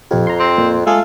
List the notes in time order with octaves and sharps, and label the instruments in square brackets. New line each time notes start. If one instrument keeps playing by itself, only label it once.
[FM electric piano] A#1 G4 [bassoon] F2
[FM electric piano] A#5 C6
[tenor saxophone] C4
[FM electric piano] A#2
[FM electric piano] G#3 A3 G#4 [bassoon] F4 [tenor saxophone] A4